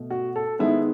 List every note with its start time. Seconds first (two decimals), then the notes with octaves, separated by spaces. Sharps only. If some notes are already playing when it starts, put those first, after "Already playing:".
Already playing: B2 A3
0.10 F#4
0.36 A4
0.59 D#3 G#3 B3 E4